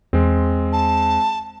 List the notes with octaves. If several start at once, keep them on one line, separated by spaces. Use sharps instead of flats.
E2 G#3 C4
A5